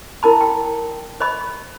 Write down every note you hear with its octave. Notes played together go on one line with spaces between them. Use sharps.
E4 A#4 A5 B5
G5
C5 D#5 B5